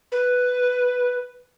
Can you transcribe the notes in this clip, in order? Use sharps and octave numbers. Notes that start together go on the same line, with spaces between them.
B4